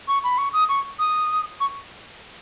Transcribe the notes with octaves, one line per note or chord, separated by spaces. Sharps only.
C#6
B5
C#6
D#6
C#6
D#6
C#6